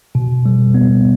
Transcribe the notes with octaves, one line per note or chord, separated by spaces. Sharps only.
B2
G3
B3